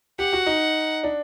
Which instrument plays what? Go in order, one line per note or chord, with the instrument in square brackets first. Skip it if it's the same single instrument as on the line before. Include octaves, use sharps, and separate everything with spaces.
[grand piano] G4 [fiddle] F#5
[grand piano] F#4
D#4
D4